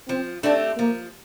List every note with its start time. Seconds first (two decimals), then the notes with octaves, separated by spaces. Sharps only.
0.08 F3 C4
0.43 A3 C4 D4 G4
0.78 F3 A#3